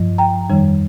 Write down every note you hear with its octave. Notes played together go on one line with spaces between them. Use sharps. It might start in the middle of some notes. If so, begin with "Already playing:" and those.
Already playing: G2 F3
G5 A#5
F2 D#3 G3